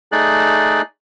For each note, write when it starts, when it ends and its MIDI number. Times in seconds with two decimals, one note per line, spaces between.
0.12 0.82 57
0.12 0.82 63
0.12 0.82 68
0.12 0.82 74
0.12 0.82 90